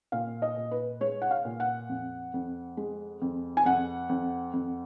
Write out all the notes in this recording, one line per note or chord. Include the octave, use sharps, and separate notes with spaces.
A#2 F5
D#5
A#2
B4
G#3 C#5
F#5
F5
A#2
F#5
F2
F2
G#3
F2
G#5
F2 F#5
F2
F2